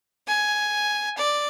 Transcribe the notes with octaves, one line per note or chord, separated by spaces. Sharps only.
G#5
D5